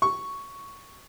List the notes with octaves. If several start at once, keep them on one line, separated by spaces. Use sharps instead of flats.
C#6